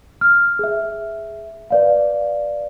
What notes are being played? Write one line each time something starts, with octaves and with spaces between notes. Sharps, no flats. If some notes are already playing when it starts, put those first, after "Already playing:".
F6
G#4 E5
B4 D5 F5